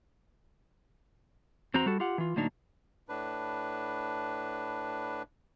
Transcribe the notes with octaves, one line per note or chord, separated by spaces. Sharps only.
E2 C4 F#4 C5 A#5
G3 F#4 A4
F4 G4 F#5
E3 F4
A2 D3 F#3 A#3 D4 D#4
A2 D4 B4